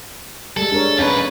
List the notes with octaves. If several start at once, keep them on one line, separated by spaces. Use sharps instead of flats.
G3 G#3 A4
D4 A#4 C#5
F2 C#4 B4 C#5